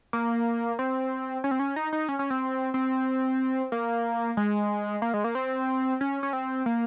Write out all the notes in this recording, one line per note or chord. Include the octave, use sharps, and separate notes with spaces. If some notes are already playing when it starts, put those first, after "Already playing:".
A#3
C4
C#4
C4
C#4
D#4
D#4
C#4
C#4
C4
C4
A#3
G#3
A#3
G#3
A#3
C4
C#4
C#4
C4
A#3